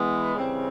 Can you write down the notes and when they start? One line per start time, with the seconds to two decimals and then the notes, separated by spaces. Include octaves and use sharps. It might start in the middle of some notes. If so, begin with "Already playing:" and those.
Already playing: E3 G#3 B3
0.34 C#3 E3 G3 C4